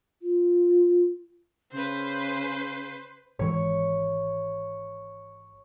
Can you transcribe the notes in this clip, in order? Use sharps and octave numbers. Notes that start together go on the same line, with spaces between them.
F4
C#3 B4 C5
G#1 E3 C#5